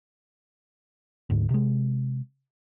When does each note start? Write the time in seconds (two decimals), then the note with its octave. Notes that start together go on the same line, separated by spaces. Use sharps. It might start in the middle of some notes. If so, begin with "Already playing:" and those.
1.30 D2 G#2
1.51 C3 G#3